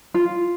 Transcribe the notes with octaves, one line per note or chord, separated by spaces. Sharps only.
F4